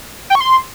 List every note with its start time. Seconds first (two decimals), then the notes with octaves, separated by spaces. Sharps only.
0.30 G5
0.35 C#6
0.40 C6